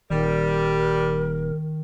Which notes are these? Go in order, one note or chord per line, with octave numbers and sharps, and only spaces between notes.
D#1 D#3 G3 A#4